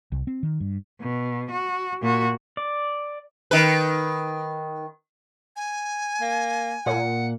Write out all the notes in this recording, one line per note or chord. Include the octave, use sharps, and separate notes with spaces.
C2
C4
D#3
G2
B2
F#4
A#2 F#4
D5
D#3 B4
G#5
A#3
A#2 F#5